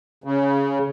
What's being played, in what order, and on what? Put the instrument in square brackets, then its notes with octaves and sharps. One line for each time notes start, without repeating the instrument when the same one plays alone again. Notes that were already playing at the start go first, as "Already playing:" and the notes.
[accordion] C#3